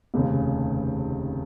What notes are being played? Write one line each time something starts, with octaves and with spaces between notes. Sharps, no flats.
F1 D#2 C#3